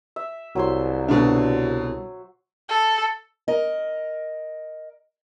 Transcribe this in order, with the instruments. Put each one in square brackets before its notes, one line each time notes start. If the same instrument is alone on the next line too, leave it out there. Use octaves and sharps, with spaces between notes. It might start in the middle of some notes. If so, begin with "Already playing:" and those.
[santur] E5
[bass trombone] C2 [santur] F#3 C5 C6
[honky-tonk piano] B2 D3 D4
[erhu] A4
[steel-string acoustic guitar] A#4 D#5